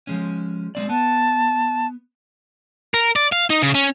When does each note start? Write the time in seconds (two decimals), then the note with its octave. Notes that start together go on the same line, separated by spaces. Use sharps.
0.07 F3 G#3 C#4
0.75 G#3 C4 D5
0.89 B3 A5
2.94 A#4
3.16 D5
3.32 F5
3.50 D#4
3.62 C#3
3.75 C#4